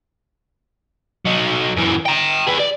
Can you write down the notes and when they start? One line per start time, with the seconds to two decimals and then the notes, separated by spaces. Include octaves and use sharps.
1.25 F#3 D#4
1.77 F#2 E3
2.06 G5 A#5
2.47 G#4 B4
2.60 D5